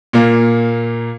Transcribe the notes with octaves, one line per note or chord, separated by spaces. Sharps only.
A#2 A#3